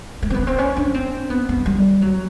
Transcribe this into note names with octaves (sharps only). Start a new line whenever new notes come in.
A3
C4
B3
C4
C#4
D4
C4
B3
B3
G3
F#3